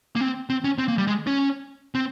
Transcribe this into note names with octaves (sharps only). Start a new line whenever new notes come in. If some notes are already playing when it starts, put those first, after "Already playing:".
A#3
C4
C4
C#4
C4
A#3
G3
G#3
C#4
C4